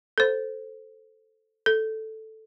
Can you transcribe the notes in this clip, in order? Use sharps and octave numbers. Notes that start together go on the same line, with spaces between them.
A4 C5
A4